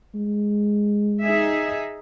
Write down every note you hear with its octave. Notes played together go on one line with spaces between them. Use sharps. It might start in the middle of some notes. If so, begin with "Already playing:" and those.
G#3
D#4 G#4 E5